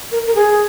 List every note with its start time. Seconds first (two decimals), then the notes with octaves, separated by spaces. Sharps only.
0.11 A#4
0.26 A#4
0.35 G#4